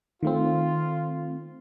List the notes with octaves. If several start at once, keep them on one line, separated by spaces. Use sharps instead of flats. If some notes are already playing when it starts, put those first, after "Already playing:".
D#3 A3 C4 F4